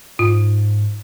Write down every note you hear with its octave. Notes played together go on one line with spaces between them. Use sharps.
G#2 F4